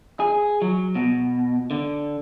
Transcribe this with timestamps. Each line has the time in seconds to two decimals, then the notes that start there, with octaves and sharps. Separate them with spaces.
0.20 G#4
0.62 F#3
0.95 B2
1.71 D3